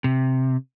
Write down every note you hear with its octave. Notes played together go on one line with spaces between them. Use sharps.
C3